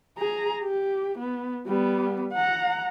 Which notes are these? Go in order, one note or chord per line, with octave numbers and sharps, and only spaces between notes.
G#4 A#5
G4
B3
G3 B3
F#5 A#5